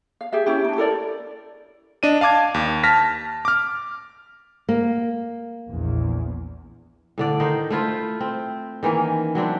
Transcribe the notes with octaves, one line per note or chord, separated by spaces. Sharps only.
F5
G4 G#4 E5
C#4 E4 G4
D4 D#4
E4 A4 A#4 D5
D4 D#5 D#7
F5 A5 D6 G#6
D#2
A5 F6 A#6 B6
D6 F6
A#3
A#1 E2
A2 D3 D5
D#3 D#4 C5
A3 E4 F4 C5
C4
D#3 E3 A#3 C#4
F#3 C4 D4 E4